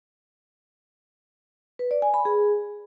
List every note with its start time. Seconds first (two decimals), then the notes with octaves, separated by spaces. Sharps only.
1.79 B4
1.91 D5
2.02 G#5
2.14 B5
2.25 G#4